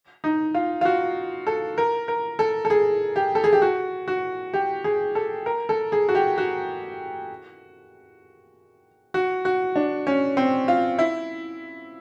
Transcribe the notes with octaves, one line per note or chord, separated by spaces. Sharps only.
D#4
F4
F4
F#4
A4
A#4
A#4
A4
A4
G#4
G4
A4
G#4
G4
F#4
F#4
G4
G#4
A4
A#4
A4
G#4
F#4
G4
F#4
F#4
F#4
D4
C#4
C4
F4
E4